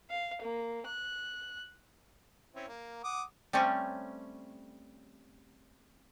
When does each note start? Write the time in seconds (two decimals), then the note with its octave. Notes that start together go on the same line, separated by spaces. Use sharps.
0.10 F5
0.42 A#3
0.87 F#6
2.55 C4 C#4 E4
2.68 A#3
3.04 F#5 D6 D#6
3.53 G3 A3 C4 C#4 C#5